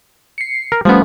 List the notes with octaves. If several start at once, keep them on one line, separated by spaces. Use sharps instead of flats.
C7 C#7
A#4
F3 G3 A3 B3 C#4